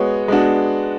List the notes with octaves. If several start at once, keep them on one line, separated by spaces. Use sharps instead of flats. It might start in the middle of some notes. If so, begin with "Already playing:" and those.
Already playing: G#3 B3 F#4 C#5
G#3 B3 D4 F#4